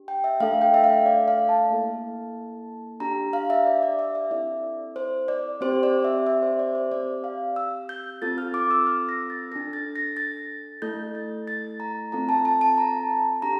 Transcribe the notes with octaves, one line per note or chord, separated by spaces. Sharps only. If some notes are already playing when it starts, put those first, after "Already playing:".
Already playing: D4 G4
G5
E5
A3 D4 A4 F5
G5
E5
F5
D5
F5
A5
A#3 E4 A4
D4 G4 A#5
F5
E5
D5
D5
E5
E5
C4 E4 A4 D5
C5
D5
C4 G4 C5
D5
E5
E5
C5
D5
C5
C4 G4 D5
F5
E6
G6
C4 F4 A4 A6
F6
D6
E6
F6
A#6
A6
D4 A4 A#6
A6
A#6
A6
A3 E4 A4 G6
A6
A6
A#5
C4 F4 A4 A#5
A5
A5
A5
A#5
D4 G4 A#5